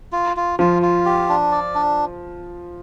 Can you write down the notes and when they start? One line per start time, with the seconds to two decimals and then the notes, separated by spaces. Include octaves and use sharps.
0.12 F4
0.37 F4
0.59 F3 F4
0.82 F4
1.06 G4
1.29 D4
1.52 D5
1.75 D4